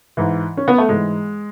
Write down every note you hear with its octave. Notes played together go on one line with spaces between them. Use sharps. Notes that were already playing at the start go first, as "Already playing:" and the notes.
G#2 E3
C#4
B3
A3
G#2 E3 G#3